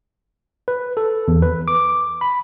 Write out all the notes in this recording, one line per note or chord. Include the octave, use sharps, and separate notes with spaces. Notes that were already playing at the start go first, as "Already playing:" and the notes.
B4
A4
E2
B4
D6
B5